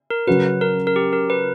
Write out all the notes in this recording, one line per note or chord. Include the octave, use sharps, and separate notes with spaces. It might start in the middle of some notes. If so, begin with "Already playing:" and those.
A#4
C#3 F#3 C#4 F#4 B4
A#4
A#4
G4
A#4
B4